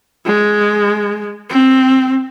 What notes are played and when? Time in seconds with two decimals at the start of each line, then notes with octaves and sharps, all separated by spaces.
0.26 G#3
1.50 C4